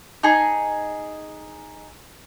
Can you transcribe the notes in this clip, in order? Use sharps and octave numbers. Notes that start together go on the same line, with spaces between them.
D#4 G#4